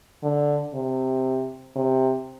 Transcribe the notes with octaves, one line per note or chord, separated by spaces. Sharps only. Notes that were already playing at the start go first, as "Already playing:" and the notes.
D3
C3
C3